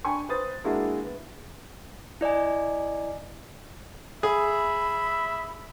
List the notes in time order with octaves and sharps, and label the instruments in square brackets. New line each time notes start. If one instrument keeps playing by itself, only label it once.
[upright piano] D4 G5 G#5 B5 C#6
B4 C5 D#6 A6
G#3 A#3 D4 E4 F#4 G#4
B3
[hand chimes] E4 D5 D#5 G#5
[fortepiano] G#4 [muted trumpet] E5 [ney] B5